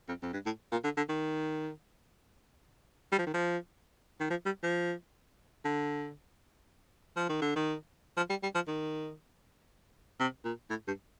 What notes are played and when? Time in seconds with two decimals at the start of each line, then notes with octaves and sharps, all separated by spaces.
0.08 F2
0.23 F2
0.33 G2
0.46 A2
0.72 A#2
0.84 D3
0.97 D3
1.09 D#3
3.12 G3
3.18 F3
3.27 D#3
3.34 F3
4.20 D#3
4.30 F3
4.46 G3
4.63 F3
5.65 D3
7.16 F3
7.29 D#3
7.42 D3
7.56 D#3
8.17 F3
8.30 G3
8.43 G3
8.55 F3
8.68 D#3
10.20 C3
10.44 A#2
10.70 A2
10.87 G2